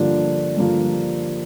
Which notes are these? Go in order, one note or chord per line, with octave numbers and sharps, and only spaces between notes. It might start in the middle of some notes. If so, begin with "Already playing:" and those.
Already playing: G2 D3 F3 A#3 D4
G2 D3 F3 A#3 D4